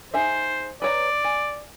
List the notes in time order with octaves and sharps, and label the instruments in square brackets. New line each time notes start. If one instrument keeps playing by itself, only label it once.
[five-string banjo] D#4 G#4 E5 [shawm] C5
[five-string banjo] B4 C#5 A#5 [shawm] D5
[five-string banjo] G#5